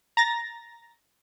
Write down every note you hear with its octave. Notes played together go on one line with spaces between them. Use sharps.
A#5 A6 A#6